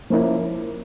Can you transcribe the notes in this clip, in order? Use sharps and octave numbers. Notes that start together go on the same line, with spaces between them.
F3 A#3 C#4 E4